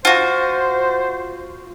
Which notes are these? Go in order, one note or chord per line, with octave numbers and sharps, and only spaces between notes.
F4 F#4 C5